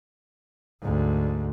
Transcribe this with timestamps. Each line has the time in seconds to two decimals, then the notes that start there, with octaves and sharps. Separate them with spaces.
0.81 D2 G#2